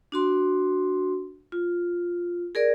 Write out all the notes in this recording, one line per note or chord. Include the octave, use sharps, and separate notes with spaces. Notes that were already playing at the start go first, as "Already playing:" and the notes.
D4 F#4 C6
F4
G#4 A#4 D5